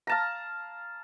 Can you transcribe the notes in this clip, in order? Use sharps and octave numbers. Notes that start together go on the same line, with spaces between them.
F5 A5 A#5